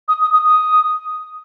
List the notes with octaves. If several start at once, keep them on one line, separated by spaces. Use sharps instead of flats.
D#6
D#6
D#6
D#6